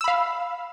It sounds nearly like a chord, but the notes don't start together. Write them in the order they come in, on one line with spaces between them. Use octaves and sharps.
E6 B5 F5